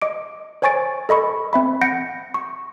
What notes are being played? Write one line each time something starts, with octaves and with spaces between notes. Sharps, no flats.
D#5 D6 D7
C5 C#5 G#5 C#6 A6 D7
A4 D#5 B5 C#6
C4 E5 B5
F#5 G6 A#6 C#7 D7
C#6